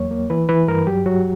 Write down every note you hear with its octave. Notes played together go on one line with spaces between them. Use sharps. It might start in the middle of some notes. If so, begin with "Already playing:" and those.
Already playing: E2 F#3 A#3 C#5
A#3
E3 B4
E3 B4
G2 A#4
F#3 G4
F#3 F#4